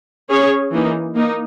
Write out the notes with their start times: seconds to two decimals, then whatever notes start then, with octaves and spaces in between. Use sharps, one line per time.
0.30 C#4 G#4 C#5
0.73 E3 A#3 D#4
1.15 A#3 D#4